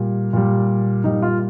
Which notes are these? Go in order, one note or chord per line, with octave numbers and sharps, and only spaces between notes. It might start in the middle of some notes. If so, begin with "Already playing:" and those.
Already playing: A#2 G3
A#2 G3
A#2 G3 D#4
F4